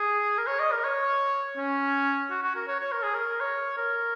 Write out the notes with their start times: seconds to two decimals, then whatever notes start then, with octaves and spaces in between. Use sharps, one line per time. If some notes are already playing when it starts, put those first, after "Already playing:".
Already playing: G#4
0.38 A#4
0.47 C#5
0.60 D#5
0.72 A#4
0.84 C#5
1.57 C#4
2.31 F#4
2.43 F#4
2.56 A#4
2.68 C#5
2.80 C#5
2.92 A#4
3.03 G#4
3.14 A#4
3.41 C#5
3.77 A#4